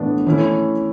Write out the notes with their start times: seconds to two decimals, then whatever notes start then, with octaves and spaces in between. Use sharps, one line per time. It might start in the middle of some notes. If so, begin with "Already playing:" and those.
Already playing: A2 E3 B3 D4
0.26 E3 A3 C#4 E4